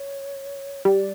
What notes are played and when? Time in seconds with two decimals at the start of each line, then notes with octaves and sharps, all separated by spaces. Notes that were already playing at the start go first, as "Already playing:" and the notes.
Already playing: C#5
0.85 G3 D5